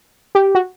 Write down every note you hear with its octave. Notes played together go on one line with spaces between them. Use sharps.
G4
F#4